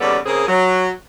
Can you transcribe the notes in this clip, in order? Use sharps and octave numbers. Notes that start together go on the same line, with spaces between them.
D#2 C#3 G3 B3 A4 D5
C#3 A#3 C4 G#4
F#3